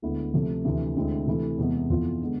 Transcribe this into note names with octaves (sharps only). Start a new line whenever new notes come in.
D2 D3 G#3 B3 E4
C3 F3 A3
D2 C3 E3
D2 D3 G#3 C4 E4
C3 E3 A3 E4
E2 C3 E3 G#3 B3
F2 E3 B3 F4
D3 G#3 B3